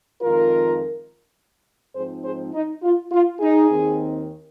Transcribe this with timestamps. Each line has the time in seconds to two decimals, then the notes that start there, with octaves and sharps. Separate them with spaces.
0.21 F2 D#3 G#3 F4 A#4
1.95 G#2 F3 C4 D#4 G#4 C5
2.24 G#4 C5
2.53 D#4
2.83 F4
3.12 F4
3.40 D#4 G#4
3.69 D#2 D#3 C4 D#4